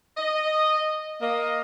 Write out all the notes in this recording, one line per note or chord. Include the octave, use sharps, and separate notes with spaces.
D#5
A#3 D#5